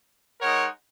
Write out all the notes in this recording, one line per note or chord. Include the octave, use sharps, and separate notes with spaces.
G#3 D#4 A#4 C#5 F#5